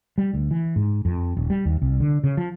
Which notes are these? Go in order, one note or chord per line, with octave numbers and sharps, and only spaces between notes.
G3
D2
E3
G#2
F2
D#1
G3
D#2
C2
D3
C#3
F3